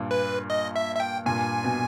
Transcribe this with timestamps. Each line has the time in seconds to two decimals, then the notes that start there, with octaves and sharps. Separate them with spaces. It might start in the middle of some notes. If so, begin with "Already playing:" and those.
Already playing: G2 A#2
0.11 B4
0.50 D#5
0.76 E5
0.96 E5
1.00 G5
1.26 G2 A#2 G#5
1.64 B2